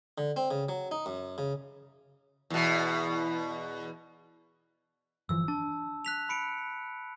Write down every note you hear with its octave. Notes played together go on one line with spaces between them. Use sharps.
D3
C4
C#3
F#3
D#4
F#2
C#3
E2 B2
G1 E3 F3 E6
D4 A5
F#6 B6 F7
B5 C#7 D7